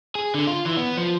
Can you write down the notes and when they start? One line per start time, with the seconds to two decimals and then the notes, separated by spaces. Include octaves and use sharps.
0.15 G#4
0.35 D3
0.47 F4
0.66 E3
0.77 B3
0.97 F3